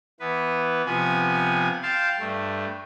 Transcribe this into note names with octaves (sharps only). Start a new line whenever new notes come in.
E3 B3 B4
C3 F3 B3 G#5
F5 G5 A5 C6
G2 A3